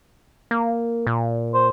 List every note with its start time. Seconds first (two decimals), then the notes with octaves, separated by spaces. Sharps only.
0.51 A#3
1.07 A#2
1.54 C5